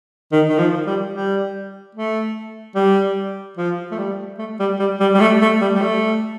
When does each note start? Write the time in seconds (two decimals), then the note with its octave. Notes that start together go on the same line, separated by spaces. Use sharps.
0.32 D#3
0.49 D#3
0.58 F3
0.86 G3
1.13 G3
1.95 A3
2.75 G3
3.57 F3
3.91 A3
3.98 G3
4.39 A3
4.60 G3
4.79 G3
5.00 G3
5.14 G3
5.20 A3
5.41 A3
5.61 G3
5.75 G3
5.81 A3